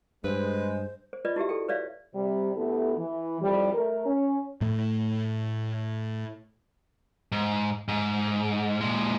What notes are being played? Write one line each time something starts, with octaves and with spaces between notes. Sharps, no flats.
G2 G#3 B4 C5
C5
F4 B4 D5 D#5
E4 F#4 G4 E5
A4 G5
B4 C#5 D5 E5 F5
C3 G3
D2 B3 E4 G4 A4
E3
F2 A2 G3
A3 A#4
C#4
A2 A3
G#2
G#2
A#2 G#3